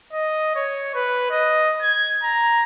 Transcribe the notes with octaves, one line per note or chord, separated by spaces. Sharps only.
D#5
C#5
B4
D#5
G#6
A#5